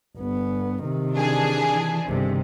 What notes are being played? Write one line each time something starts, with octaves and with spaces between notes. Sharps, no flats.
G1 B3
C3 D#3
E3 D4 G#4
G1 C3 D#3